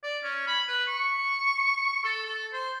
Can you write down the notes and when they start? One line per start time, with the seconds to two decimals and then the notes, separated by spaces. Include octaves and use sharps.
0.03 D5
0.23 C#4
0.47 B5
0.68 B4
0.88 C#6
2.04 A4
2.25 A4
2.53 C5